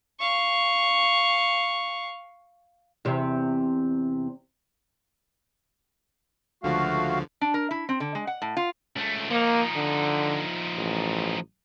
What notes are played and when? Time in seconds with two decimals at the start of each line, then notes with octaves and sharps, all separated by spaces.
0.19 F5 C#6
3.05 E2 C3
6.63 C#2 D3 F3 A3 F#4 F5
7.41 D4
7.54 A#4
7.71 E4
7.89 C4
8.00 D3
8.15 G#3
8.27 F#5
8.42 A2
8.57 F4
8.96 C#2 A3
9.30 F3 A#3 D#4
9.75 D3
10.77 A1